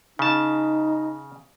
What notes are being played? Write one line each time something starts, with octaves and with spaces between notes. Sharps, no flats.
C#3 D#4 A5